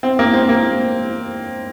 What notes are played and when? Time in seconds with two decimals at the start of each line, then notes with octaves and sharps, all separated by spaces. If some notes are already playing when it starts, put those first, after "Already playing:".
0.03 C4
0.19 A#3
0.34 C4
0.49 A#3